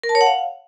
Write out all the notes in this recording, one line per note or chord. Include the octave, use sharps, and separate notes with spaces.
A#4
A5
C#5
F#5
F5